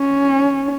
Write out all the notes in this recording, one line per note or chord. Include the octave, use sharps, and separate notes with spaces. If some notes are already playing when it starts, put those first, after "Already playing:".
Already playing: C#4